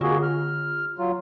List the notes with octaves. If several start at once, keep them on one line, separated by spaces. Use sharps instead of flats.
D3 A#3 F4 F#4 G#4
F6
F#3 F4